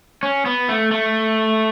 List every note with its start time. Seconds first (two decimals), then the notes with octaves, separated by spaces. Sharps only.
0.23 C#4
0.46 B3
0.69 A3
0.91 A3